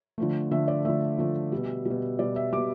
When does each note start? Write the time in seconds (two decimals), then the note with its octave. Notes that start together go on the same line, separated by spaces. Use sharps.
0.18 D3 F3 A3
0.51 D3 F3 A3 E5
0.68 D5
0.85 D3 F3 A3 E5
1.18 D3 F3 A3
1.52 B2 G3
1.85 B2 G3
2.19 B2 G3 D5
2.36 E5
2.53 B2 G3 D6